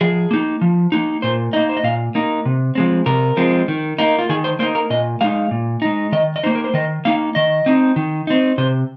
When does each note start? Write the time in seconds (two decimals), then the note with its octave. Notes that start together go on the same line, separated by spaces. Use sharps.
0.01 F3 G#4
0.31 A#3 D#4
0.61 F3
0.92 A#3 D#4
1.22 A#2 C5
1.53 A#3 D#4 D#5
1.69 C5
1.77 D#5
1.84 A#2 F5
2.15 A#3 D#4
2.45 C3
2.75 F3 G#3 C4
3.06 C3 A#4
3.37 F3 G#3 C4
3.68 D#3
3.98 A#3 D#4
4.19 F4
4.29 D#3 G#4
4.44 C5
4.59 A#3 D#4 C5
4.75 A#4
4.90 A#2 D#5
5.21 G#3 D#4 F5
5.51 A#2
5.82 G#3 D#4
6.12 D#3 D#5
6.36 D#5
6.44 A#3 D#4 C5
6.55 A#4
6.64 C5
6.74 D#3 D#5
7.05 A#3 D#4 F5
7.35 D#3 D#5
7.66 C4 D#4
7.96 D#3
8.27 C4 D#4
8.58 C3 C5